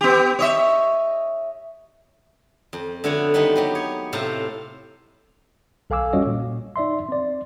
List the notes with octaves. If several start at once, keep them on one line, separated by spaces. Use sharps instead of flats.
B3 G4
C#5 D#5 E5
F2
D3 A3 B3 F#4 C#5
F2 D#3 G3 B3 D#4 B5
F#3 B3 G4
C#5
A2 C3 C5 F5 A5 A#5
B1 A4 F5 G#5 D6 E6
G3 C#4 F4 F#4 C#5 D#5
A#2
D#4 D5 E5 C6
C4 D5